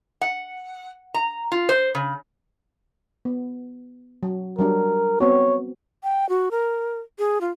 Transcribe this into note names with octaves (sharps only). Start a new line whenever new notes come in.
F#5
A#5
F4
C5
C#3
B3
F#3
F#3 G3 D4 A#4
B3 C4 F#4 C#5
G5
F#4
A#4
G#4
F4